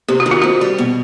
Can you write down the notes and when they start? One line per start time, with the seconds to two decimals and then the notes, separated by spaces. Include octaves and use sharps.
0.08 C3 G4
0.20 F#4
0.26 D#3
0.31 F4
0.41 C4 F#4
0.61 G3
0.78 B2